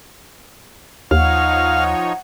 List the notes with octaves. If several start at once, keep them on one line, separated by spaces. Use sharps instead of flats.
D#2 F3 D#4 C#5 F5 F#5